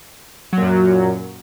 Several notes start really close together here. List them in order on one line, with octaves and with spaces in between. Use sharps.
F#3 A#2 F#2